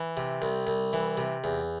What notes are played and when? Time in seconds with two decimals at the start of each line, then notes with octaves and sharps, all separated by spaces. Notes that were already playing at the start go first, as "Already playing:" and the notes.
Already playing: E3
0.17 C3
0.42 C2
0.67 C2
0.93 E3
1.17 C3
1.44 E2